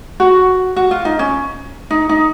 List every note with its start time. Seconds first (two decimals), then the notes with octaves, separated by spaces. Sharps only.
0.20 F#4
0.76 F#4
0.91 F4
1.05 D#4
1.19 C#4
1.91 D#4
2.09 D#4